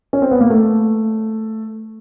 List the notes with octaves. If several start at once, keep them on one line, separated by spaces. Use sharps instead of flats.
C#4
C4
B3
A#3
A3